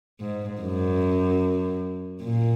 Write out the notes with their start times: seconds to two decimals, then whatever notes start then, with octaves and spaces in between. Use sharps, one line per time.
0.20 G#2
0.61 F#2
2.23 A#2